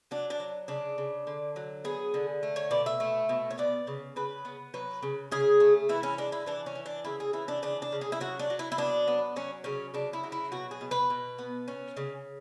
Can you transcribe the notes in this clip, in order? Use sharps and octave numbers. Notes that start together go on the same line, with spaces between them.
F#3 D4
D4
F#3
C#3 D4
C#3
D3
F#3
B3 G#4
D3
A3
C#5
B2 D5
E5
A3
B2
C#5
B3 D5
C#3
C#3 B4
B3
F#3 B4
C#3
C#3 G#4
A3
E3 E4
C#4
G#3 D4
E4
E3 D4
C#4
E3
D4
C#3 E4
G#4
E3 E4
D4
C#3 D4
D4
C#3
G#4
E4
F#3 F#4
D4
F#3
E4
E4
B3 D4
B3
F#3 C#4
C#3 C#4
C#3 D4
E4
F#3
E4
B2 F#4
G#4
B2
B4
B2
B3
C#4
C#3